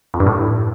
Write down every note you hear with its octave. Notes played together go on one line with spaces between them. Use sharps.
F2
G2
A2